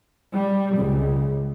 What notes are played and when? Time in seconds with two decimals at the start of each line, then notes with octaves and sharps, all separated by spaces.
0.36 G3
0.78 C#2